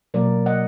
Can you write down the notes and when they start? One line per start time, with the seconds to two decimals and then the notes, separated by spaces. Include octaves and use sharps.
0.14 B2 F#3 A#3 A#4 D5
0.46 D#5 F#5